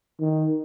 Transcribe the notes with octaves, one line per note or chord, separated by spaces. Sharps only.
D#3